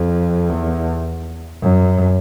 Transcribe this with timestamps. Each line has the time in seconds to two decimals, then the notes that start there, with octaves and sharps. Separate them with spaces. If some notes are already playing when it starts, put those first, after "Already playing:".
Already playing: F2
0.50 E2
1.62 F#2